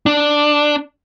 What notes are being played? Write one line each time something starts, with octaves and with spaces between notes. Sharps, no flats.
D4